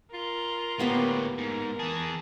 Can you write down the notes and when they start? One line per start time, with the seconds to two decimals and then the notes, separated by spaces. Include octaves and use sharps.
0.14 F4 A#4
0.79 A2 D3 A#3 B3 G4
1.38 G#2 A#4
1.79 E3 G#4 A5